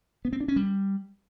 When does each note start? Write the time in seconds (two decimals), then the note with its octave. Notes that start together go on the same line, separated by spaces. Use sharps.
0.25 B3
0.33 C4
0.40 D4
0.48 C#4
0.56 G3